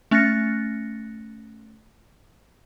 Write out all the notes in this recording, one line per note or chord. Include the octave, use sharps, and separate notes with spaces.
A3 C#4 F#6 A6 A#6 C#7